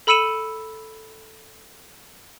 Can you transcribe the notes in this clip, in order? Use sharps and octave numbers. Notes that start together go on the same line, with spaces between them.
A4 B5 E6 C#7 D#7 E7